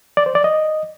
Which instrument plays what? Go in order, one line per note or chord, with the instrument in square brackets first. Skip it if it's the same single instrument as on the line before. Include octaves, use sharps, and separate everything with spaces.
[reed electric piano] D5
C5
D5
D#5